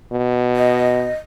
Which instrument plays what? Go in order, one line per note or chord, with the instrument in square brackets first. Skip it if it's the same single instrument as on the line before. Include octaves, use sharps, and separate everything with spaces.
[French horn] B2
[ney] D#5